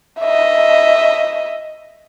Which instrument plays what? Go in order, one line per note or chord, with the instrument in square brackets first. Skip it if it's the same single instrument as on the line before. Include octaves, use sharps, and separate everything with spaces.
[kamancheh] D#5 E5